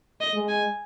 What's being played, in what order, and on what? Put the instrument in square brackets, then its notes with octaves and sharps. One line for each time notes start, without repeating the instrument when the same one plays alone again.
[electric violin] D#5
[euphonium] G#3
[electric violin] G#5